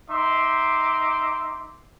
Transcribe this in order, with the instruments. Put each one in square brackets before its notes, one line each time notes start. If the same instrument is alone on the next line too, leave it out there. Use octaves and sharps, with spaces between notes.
[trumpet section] D#4 E5 C6 D6